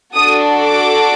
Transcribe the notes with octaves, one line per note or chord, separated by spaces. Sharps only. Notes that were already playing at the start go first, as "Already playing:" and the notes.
D4 F#4 A4 D#6
D6